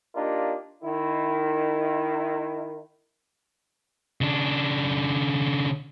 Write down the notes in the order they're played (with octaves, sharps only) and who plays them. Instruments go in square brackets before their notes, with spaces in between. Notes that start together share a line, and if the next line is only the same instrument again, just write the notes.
[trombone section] A#3 D4 D#4 F4 G4 A#4
D#3 E4
[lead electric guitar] C#3 D4